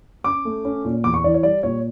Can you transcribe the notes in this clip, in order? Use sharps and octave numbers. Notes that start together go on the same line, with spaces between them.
C#4 D6
A3
C#4
A#2
E2 D6
C#6
E3 D5
C#5
G3 D5
A#2 C#5